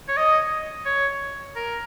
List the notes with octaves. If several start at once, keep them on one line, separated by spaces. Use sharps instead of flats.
C#5
D#5
C#5
A#4